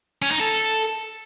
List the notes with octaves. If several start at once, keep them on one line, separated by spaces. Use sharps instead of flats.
C#4
D#4
A4